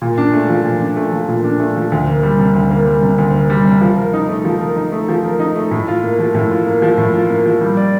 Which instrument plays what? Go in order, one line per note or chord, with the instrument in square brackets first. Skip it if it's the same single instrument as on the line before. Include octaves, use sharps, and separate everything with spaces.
[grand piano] A#2
D4
A3
F3
A#2
D4
A3
F3
A#2
D4
A3
F3
D2
A#3
G3
C3
D2
A#3
G3
C3
D2
A#3
G3
C3
F3
A#4
D#4
A3
F3
A#4
D#4
A3
F3
A#4
D#4
A3
A2
F4
A#3
F3
A2
F4
A#3
F3
A2
F4
A#3
F3
G3
D5